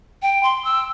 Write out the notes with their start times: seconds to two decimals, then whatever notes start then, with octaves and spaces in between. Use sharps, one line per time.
0.22 G5
0.43 C6
0.65 E6